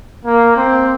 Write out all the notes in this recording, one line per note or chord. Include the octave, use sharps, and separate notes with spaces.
A#3
C4